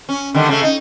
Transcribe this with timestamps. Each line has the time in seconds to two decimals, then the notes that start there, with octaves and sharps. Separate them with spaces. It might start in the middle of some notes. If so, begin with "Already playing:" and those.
0.09 C#4
0.34 D3 D#3 G3
0.49 C#3 A3
0.63 D#4